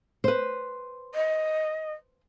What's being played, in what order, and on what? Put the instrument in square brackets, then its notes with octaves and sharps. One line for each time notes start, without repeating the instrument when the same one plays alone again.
[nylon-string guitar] B4 C5
[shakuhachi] D#5